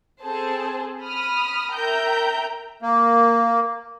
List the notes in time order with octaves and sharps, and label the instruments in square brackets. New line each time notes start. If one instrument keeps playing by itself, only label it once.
[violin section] C4 G#4 A4 C5 A5
B5 D#6 F6
A#4 E5 G5 A#5 G6
[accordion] A#3